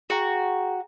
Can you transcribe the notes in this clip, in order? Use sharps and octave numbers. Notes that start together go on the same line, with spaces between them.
F#4 G#4 G5 A#5